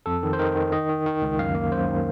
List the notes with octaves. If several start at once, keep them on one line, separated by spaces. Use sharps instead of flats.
F2 A4
D#3
C5
D#3 A#4
D#3
D#3 D#5
D#3
D#3
C#2
F#2 F5
A#3
F#2 C5
D#3